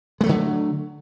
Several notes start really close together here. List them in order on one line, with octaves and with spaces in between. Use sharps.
G#3 A3 F#3 D3